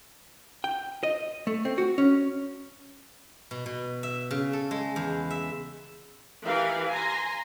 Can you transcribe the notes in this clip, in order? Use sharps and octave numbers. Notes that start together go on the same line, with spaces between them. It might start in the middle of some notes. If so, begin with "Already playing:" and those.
G5
D#5
A3
C4
F#4
C#4
B2
B2
E5
C#3
A4
G#3
E2
E5
E3 G4 A#4 F5
G#5 A#5 C6